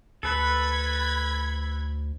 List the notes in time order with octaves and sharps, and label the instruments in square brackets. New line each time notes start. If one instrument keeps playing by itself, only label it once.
[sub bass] D2 [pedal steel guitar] A4 B4 [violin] B5 G#6